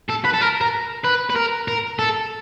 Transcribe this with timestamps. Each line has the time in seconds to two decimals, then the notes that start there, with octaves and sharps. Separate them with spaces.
0.09 A4
0.24 B4
0.33 A4
0.41 A#4
0.61 A#4
1.04 B4
1.30 B4
1.36 A#4
1.68 A#4
1.99 A4